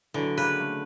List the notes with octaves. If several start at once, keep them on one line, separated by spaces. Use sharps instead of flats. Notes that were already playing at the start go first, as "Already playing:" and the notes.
D3 E3 F#3
C#3 A#3 B4
A3